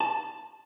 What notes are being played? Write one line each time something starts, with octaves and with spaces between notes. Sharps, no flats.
A5